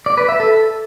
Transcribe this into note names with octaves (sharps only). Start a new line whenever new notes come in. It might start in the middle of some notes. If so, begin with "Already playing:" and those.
D5
B4
E5
A4